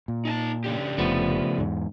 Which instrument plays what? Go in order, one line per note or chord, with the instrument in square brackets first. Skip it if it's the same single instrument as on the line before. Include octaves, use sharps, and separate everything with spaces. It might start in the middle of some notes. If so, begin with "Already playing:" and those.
[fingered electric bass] A#2
[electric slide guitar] D#4 G#5 A5
C#3 D4 G4
[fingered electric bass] F1 [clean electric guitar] F3 A3 B3
[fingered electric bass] E2 G#2